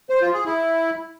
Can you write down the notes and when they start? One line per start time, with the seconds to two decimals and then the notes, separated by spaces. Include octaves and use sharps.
0.10 C5
0.22 F4
0.34 G#4
0.45 E4